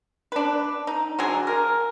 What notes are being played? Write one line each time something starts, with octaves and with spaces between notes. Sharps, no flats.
D4 B4
D#4
D3 F#3 G#4
A#4